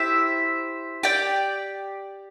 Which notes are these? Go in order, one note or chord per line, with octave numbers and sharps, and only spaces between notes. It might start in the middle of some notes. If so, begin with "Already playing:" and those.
Already playing: E4 G4 C5 E5
G4 D5 G5